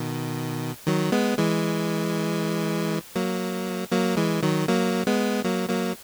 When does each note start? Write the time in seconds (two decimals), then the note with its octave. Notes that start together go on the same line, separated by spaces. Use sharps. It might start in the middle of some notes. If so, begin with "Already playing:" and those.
Already playing: B2 D#3
0.87 D#3 F#3
1.12 G#3 B3
1.38 E3 G#3
3.15 F#3 A#3
3.92 F#3 A#3
4.17 E3 G#3
4.43 D#3 F#3
4.68 F#3 A#3
5.07 G#3 B3
5.44 F#3 A#3
5.69 F#3 A#3